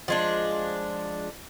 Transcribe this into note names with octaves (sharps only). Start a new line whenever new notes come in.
F3 G#3 D4